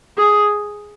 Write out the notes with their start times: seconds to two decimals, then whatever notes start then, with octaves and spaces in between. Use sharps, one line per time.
0.18 G#4